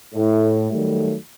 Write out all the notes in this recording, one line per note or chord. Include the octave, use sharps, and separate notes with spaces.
A2
D#3 F#3 G3 A3